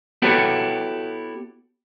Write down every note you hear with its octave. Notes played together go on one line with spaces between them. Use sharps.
B3 E4 F#4 G4 A4 C#5